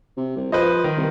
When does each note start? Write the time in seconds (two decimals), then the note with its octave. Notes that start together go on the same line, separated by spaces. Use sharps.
0.17 C3
0.37 C2
0.52 F3 B4 C5 D#5
0.84 D#3
0.97 C2